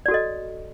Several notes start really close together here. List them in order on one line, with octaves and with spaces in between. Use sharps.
D5 F#4 A4 D#5